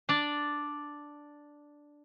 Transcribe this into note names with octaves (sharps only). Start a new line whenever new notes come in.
D4 D5